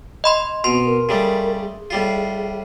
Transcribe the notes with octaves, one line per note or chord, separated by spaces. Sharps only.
D#5 B5 C6
B2 C4 C6
A#4
C#3 G3 A3
G#4
A2 G3 F4